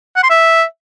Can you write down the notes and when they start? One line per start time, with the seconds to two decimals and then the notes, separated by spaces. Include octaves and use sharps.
0.16 F#5
0.23 C6
0.30 E5